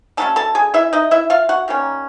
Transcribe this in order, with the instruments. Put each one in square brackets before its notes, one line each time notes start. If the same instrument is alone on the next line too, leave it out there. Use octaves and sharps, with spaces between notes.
[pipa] D3 F#3 A3 C#4 A4 A5
A4 A5
G#4 G#5
E4 E5
D#4 D#5
E4 E5
F4 F5
F#4 F#5
D#3 G3 A#3 C#4